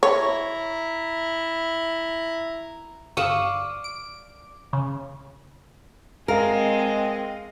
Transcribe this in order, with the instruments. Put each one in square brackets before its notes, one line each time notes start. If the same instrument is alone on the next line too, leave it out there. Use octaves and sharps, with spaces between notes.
[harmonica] E4 A#5 [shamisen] C#5
[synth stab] G1 D#6 E6 [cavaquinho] D5 F5 C#6
[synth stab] D7
C#3
[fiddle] G#3 [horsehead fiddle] C4 D#5 [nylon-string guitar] A#4 [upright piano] F5